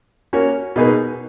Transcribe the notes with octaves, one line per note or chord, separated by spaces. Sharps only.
A#3 C#4 F#4 C#5
B2 A#3 D#4 G#4 B4